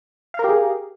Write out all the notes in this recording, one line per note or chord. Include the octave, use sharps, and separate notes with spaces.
G4 G#4 A#4 F5